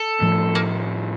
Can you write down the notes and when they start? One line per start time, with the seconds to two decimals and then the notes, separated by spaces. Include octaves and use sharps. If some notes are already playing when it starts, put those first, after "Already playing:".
Already playing: A4
0.21 A2 F3 A3
0.55 A#3